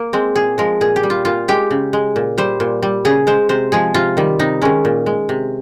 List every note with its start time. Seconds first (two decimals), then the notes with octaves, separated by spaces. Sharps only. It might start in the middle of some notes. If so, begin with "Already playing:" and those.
Already playing: A#3
0.13 G#3 C4
0.36 A#2 G#4
0.58 F3 G#3 A#4
0.81 A#2 G#4
0.96 G4
1.03 G3
1.10 F4
1.25 A#2 F4
1.48 G#3 G4
1.71 C#3
1.93 G#3
2.16 A#2
2.38 G3 C5
2.60 A#2
2.83 G3
3.05 C#3 G#4
3.27 G#3 C5
3.49 C3 C5
3.72 F3 G#3 G#4
3.94 C3 F4
4.17 D#3 G3
4.39 C3 D#4
4.62 D#3 G#3 C#4
4.85 A#2
5.06 G#3
5.29 C3